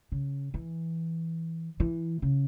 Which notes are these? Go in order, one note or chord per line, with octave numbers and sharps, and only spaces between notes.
C#3
E3
E3
C#3